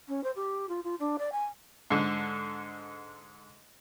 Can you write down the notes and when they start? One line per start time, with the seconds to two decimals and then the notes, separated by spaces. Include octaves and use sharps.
0.08 C#4
0.23 C5
0.35 G4
0.68 F4
0.84 F4
0.99 D4
1.18 D5
1.32 G#5
1.90 G#2 D3